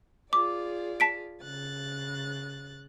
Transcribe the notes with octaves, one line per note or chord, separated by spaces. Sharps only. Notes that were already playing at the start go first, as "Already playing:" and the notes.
F4 G#4 D5 D6
A5 B6 D7
C#3 F#6 A6